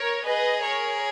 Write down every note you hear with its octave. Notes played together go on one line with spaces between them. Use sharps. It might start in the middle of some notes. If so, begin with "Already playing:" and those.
Already playing: A#4 C#5
G#4 B4 D#5
A#4 C#5